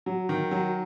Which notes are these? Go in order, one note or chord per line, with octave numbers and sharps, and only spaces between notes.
F#3
D#3
F#3